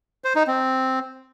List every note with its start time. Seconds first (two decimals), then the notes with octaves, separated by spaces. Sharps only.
0.24 C5
0.36 D#4
0.47 C4